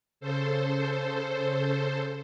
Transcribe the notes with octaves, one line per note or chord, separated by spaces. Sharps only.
C#3 A4 C5